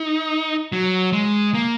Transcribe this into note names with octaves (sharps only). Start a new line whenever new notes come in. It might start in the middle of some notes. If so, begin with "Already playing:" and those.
Already playing: D#4
F#3
G#3
A#3